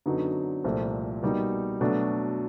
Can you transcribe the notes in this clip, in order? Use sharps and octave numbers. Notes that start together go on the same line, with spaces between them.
F#2 D3 F#3 B3 D#4
C2 A#2 F3 A3 C4
B2 G3 A#3 D#4
B2 F#3 A3 D4